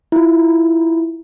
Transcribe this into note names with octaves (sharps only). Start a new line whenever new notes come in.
E4 F4